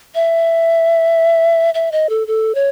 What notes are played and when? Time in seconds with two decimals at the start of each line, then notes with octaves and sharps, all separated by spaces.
0.15 E5
1.74 E5
1.92 D#5
2.09 A4
2.27 A4
2.55 C#5